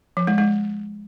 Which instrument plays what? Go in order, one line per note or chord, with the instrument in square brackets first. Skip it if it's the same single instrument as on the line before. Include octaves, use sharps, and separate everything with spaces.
[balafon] F3
G#3
G#3